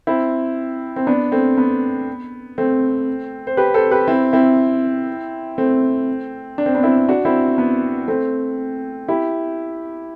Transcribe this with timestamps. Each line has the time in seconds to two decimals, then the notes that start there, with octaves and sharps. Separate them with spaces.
0.07 C4 E4
0.96 C4
1.07 B3 D4
1.32 A3 C4
1.57 B3
2.58 A3 C4
3.47 C5
3.57 G4 B4
3.74 A4 C5
3.91 G4 B4
4.08 C4 E4
4.33 C4 E4
5.58 A3 C4
6.58 D4
6.66 C4
6.75 B3 D4
6.83 C4 E4
7.09 D4 F#4
7.25 C4 E4
7.58 B3
8.08 A3 C4
9.08 E4 G4